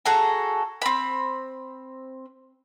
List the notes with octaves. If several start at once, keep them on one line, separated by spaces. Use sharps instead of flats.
F#4 G#4 A4 A#5
C4 B5